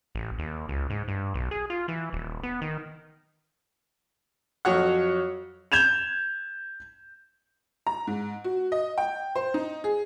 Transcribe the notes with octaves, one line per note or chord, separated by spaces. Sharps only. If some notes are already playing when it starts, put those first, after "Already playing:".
A1
D#2
C#2
G#2
G2
B1
G#4
F4
E3
D#1
B3
D#3
F2 F#3 F#4 C#5 F#5
G6 G#6 E7 F7
A#5
G#2
F#4
D#5
G5
C5
D#4
G#4